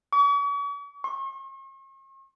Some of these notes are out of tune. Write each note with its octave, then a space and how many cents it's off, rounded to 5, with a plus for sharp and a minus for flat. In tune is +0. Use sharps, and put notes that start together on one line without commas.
C#6 +45
C#6 -45